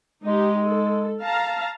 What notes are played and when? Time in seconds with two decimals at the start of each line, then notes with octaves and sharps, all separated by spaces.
0.24 G#3 D#4 G4
0.66 A4
1.22 F5 A5 A#5